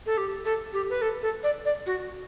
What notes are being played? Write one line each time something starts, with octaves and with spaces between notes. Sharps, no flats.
A4
G4
A4
G4
B4
A4
A4
D5
D5
F#4